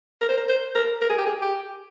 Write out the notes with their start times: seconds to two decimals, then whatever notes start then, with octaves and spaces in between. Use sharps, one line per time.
0.21 A#4
0.29 C5
0.37 A#4
0.48 C5
0.75 A#4
1.01 A#4
1.09 G#4
1.18 G4
1.26 G#4
1.42 G4